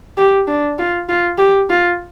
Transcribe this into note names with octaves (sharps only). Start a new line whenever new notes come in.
G4
D4
F4
F4
G4
F4